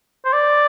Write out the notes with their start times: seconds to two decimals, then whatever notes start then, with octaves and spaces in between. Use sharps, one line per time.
0.25 C5
0.33 D5